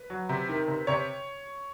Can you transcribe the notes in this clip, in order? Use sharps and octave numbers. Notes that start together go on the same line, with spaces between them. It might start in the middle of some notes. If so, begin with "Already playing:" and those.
Already playing: B4
F#3
C3
D#3
C3
C3 C#5